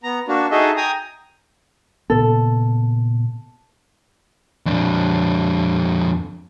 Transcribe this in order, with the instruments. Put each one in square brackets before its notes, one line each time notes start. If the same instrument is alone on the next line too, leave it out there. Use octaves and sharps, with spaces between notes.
[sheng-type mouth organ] B3 A#5
A#3 D4 F#4
D#4 F#4 G#4 A4 D#5 E5
G5 G#5 A#5 D#6
[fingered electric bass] A#2 C#3 B3 [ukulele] A4
[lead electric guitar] F2 D4